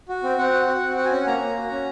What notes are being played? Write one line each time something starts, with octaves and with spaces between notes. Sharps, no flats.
F#4
C4
C4 F#5
F#4
F#4
C4
F#4 F#5
G#5
C#4 F#5
A#3 A#5
A#3
F#4
C#4